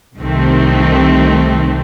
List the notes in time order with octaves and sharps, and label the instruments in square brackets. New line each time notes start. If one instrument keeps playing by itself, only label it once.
[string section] C2 C3 D#3 A3 C4